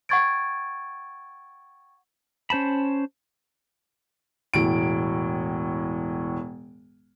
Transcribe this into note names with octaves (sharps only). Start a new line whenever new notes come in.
F#5 G5 C#6 G#6 A6 D7
C#4 C5 A5 B5
E1 A2 D7